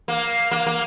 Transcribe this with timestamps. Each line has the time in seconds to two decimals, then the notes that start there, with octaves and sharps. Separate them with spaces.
0.08 A#3
0.51 A#3
0.66 A#3